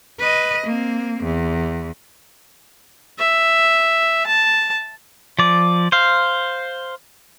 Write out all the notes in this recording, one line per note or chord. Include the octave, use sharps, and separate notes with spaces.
B4 D#5
A#3 C4
E2
E5
A5
F3 D5
C5 F5